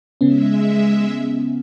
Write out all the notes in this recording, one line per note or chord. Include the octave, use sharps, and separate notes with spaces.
C#3 G#3 B3 C#4 E5